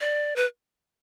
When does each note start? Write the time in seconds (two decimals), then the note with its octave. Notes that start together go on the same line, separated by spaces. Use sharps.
0.01 D5
0.36 B4